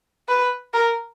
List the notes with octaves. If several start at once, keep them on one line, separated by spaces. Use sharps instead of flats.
B4
A#4